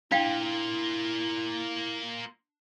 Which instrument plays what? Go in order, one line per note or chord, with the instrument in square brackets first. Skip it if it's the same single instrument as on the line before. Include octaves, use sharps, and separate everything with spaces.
[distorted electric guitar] A#3 F4 [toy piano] D4 F5 G5 [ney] E4